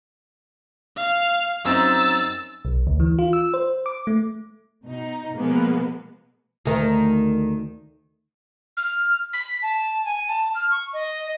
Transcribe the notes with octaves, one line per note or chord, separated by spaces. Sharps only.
F5
F#2 C4 D#4 E6 A6
B1
D2
E3
F4
E6
C5
D6
A3
B2 D#4
B2 F3 G#3 A#3 B3
D2 D#3
F6
B6
A5
G#5
A5
F6
C#6
D#5